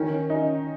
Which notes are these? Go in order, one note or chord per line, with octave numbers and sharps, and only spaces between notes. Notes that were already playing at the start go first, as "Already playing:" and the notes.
Already playing: D#3 C#4
D#4